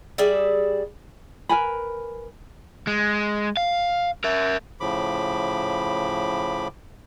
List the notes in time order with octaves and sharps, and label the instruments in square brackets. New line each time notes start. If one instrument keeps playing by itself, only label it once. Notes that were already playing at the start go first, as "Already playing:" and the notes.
[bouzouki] G3 G#4 D5 E5
[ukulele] A#4 B4 G#5 B5
[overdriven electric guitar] G#3
F5
A#4 E5
[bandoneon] A2 C#3 F3 B5 D6